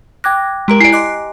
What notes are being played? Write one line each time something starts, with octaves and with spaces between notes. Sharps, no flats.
G5 D6 F#6 G#6 A#6
G#3 G4 A#4 A#5 D7
E4 D5 G#5 C7 D7
D#5 C6 D6 F#6